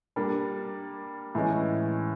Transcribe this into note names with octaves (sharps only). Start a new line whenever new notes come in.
G3 A#3 D4
A2 E3 G#3 C#4